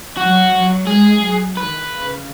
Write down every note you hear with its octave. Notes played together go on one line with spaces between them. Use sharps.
F#3 F#4
F#3
G#3 G#4
F#3
D#3 B4
C#3